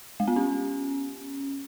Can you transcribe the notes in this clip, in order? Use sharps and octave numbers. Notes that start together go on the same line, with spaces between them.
G#3
B3
C#4